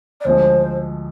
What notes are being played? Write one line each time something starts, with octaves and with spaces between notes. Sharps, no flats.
D5
D2 D3 F3 G#3 C5